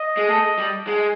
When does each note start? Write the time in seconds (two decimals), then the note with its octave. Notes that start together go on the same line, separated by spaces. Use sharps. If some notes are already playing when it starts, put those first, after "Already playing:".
Already playing: D#5
0.17 G#3
0.28 A3
0.58 G3
0.87 G#3